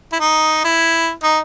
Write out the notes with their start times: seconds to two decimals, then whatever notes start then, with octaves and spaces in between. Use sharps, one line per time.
0.13 E4
0.20 D#4
0.65 E4
1.23 D#4